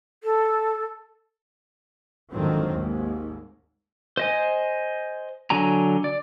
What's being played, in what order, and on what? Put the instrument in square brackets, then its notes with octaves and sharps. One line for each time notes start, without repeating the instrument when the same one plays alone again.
[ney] A4
[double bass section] G#1 F2 D3 D#3 F#3 C4
G#1 D#2 G#2
[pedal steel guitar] C5 D#5 G#5
D3 F#3 G#5 A#5
D5